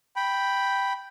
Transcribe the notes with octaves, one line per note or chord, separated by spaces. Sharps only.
G5 B5